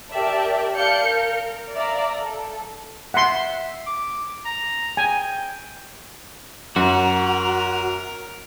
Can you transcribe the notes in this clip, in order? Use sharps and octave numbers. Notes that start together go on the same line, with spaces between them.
G4 A#4 D5 E5 A5
D5 F5 A5 G6 C#7
A#4
D5 E5 F5 A#5
A4
E5 F#5 C6
D6
A#5
G5 G#5
F#2 F#4 A#4